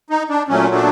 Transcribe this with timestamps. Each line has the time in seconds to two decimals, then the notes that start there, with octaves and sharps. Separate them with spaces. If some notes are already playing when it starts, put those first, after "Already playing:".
0.10 D#4
0.29 D4
0.48 A#2 F#3 A3 C#4
0.75 D4